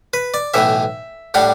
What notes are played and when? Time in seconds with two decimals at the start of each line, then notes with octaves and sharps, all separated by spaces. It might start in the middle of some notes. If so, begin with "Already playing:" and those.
0.13 B4
0.34 D5
0.54 B1 A2 E3 E5
1.34 A2 G3 D4 F#5